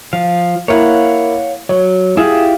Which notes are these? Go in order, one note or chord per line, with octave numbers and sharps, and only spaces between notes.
F3 F5
A#3 E4 C#5 F5 F#5
F#3 C#5
E4 F4 G4 G#4